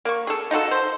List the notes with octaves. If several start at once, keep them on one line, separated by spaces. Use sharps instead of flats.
A#3 C#6
G#4 A4
D#4 F4 F#4 A4
C5